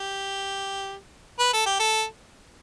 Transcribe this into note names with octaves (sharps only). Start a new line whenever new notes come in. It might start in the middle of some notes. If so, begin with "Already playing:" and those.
Already playing: G4
B4
A4
G4
A4